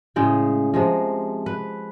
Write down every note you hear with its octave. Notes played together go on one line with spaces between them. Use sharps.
A2 C#3 G#3 G5
C3 F3 G#3
B4